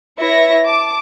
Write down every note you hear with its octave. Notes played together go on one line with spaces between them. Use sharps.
E4 B4 C#5 E5 A#6 C#7
A5 D6